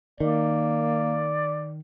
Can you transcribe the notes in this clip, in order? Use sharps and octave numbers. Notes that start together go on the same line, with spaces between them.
D#3 A#3 D5